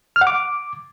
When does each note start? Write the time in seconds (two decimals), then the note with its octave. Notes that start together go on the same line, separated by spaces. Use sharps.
0.16 F6
0.21 F#5
0.27 D6